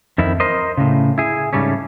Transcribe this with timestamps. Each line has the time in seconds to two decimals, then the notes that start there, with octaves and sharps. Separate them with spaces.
0.18 F2 D#3 E4
0.40 A#4 C5 D#5
0.78 A2 C#3
1.18 E4 G#4
1.53 G#2 C#3 G3 A3 C#4